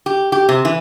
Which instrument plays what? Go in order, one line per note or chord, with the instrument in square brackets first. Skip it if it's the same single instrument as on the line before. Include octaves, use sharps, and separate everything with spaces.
[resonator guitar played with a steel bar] G4
G4
C3
E3